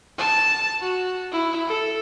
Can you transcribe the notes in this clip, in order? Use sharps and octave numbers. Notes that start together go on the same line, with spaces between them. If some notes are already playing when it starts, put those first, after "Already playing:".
A5
F#4
E4
A4